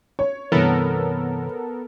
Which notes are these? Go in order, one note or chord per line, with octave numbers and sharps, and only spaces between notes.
C#5
G2 C3 E3 B3 A4 A#4